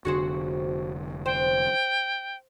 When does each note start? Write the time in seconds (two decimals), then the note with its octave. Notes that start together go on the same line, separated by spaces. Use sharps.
0.05 F1 D3 F#4 G#4 C5
1.26 C5 G5